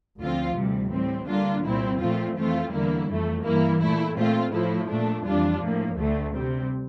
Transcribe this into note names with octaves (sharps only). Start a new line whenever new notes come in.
D2 D3 F3 C4 F4
D2 C3 E3 G3
A2 G3 C4
D3 G3 A#3 D4 F4
C2 A#2 G3 C4 E4
A#2 F3 A3 C4 F4
F2 E3 A3 C4 F4
E2 D3 G3 A#3 E4
F2 E3 A3
G2 E3 A#3 E4
A#2 A3 E4
A#2 A3 C4 F4
A2 F3 A3 E4
A#2 A3 D4
F2 E3 G3 D4 F4
A2 F3 A#3
D2 D3 A3
C3 G3 C4